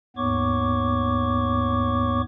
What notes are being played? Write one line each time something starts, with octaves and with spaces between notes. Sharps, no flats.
D#2 G#2 B3 C#5 C#6 D6